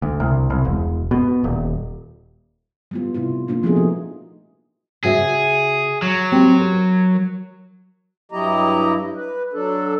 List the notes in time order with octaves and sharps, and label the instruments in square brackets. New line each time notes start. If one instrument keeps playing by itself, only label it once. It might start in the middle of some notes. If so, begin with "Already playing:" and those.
[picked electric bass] D2
C2
C2
E1
B2
D#1
[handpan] G3 B3 F4
C3 A3 E4 F4
A#2 A#3 D4 F4
F3 A3 B3 C4 D#4 G#4
F#4
[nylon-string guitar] C#3 F#4 E5 [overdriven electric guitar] G#4
[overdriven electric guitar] F#3
[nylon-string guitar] C4 G4
A#4
[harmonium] G2 F#3 E4 G4 D#5 A#5
B4
F#3 D4 A4